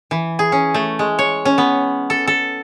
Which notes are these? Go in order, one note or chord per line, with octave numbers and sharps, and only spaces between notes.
E3
G#4
C#4
A3
G#3
C#5
C#4
B3
A4
A4